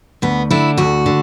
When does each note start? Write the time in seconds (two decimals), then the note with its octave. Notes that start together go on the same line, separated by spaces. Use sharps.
0.22 D2 B3
0.51 D3 E4
0.77 D2 F#4
1.06 D3